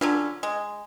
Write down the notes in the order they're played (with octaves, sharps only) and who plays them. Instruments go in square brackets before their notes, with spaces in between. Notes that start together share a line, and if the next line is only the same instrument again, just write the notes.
[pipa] D3 F#3 C#4 [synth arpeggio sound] D4 F4 B6
[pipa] G#3